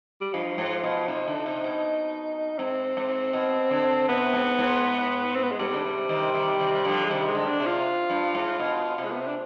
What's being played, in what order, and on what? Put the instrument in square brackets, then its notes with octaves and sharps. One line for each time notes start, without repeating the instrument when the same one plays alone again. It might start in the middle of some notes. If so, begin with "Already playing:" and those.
[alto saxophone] G3
[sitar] G2 [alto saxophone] F3
[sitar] G#2
B2
[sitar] C3 [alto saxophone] D#4
[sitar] D3
C3
B2
[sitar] G#2 [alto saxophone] C4
[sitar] G#2
B2
D3
[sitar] C3 [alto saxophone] B3
[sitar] G#2
G#2
[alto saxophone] C4
B3
G#3
[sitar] G#2 [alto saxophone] G3
[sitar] D3
C3
C3 D#3
C3 D#3
C3 D#3
D3 F3
[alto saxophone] G#3
[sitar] C3 D#3 [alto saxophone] G3
[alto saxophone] G#3
[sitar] D3
[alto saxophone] D4
[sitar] C3
[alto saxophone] F4
[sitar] G2
G#2
B2
C3
[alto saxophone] G#3
B3
C4
D4